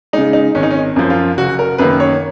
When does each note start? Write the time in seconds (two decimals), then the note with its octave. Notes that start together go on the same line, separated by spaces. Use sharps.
0.13 C#3 G#3 D#4
0.33 D#4
0.55 G#1 C#4
0.63 D#4
0.71 C#4
0.96 F#2 F3
1.10 F4
1.37 F#1 F#4
1.59 A#4
1.78 F#2 D#3 A#3 B4
2.00 C#5